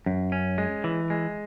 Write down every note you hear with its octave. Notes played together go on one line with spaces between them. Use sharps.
F#2
C#4
G#3
E3
G#3